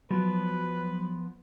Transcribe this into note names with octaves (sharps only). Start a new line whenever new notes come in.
F3 F#3 B3 B4